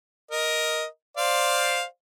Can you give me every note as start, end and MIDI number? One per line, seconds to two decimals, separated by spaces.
0.31 0.86 70
0.31 0.86 75
1.17 1.84 72
1.17 1.84 74
1.17 1.84 77